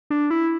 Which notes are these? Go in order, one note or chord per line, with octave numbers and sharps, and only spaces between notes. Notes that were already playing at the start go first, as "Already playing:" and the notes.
D4
E4